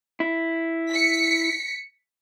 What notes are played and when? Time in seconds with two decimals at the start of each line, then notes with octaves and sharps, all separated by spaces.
0.20 E4
0.90 B6 C#7